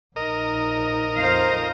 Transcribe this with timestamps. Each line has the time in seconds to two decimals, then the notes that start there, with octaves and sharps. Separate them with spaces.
0.16 A#1 D#4 A#4 D#5
1.16 F2 C5 F5 A#5